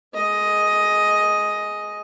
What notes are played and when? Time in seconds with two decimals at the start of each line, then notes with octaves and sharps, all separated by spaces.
0.14 G#3 D#5